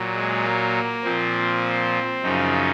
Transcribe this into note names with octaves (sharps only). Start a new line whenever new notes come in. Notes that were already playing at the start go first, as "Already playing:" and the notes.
Already playing: A#2 F#3
G#3
A#3
A#2 F3 C4
F#2 C#3 F3 D#4